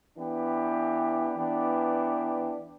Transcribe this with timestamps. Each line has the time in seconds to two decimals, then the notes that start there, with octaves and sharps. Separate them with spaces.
0.18 E3 B3 D4 G4
1.36 E3 B3 D4 G4